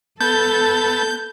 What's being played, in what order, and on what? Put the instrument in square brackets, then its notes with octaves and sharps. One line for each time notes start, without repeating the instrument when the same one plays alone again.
[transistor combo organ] B3 A5 [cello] A4 [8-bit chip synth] G6